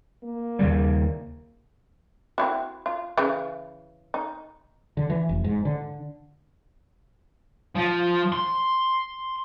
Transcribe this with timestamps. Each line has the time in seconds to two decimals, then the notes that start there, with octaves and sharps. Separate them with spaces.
0.24 A#3
0.59 D#2 C#3 G3
2.38 C4 E4 F#4
2.86 F4
3.17 C#3 E3
4.14 D#4
4.97 D3
5.10 E3
5.29 F1
5.44 G#2
5.65 D3
7.75 F3
8.32 C6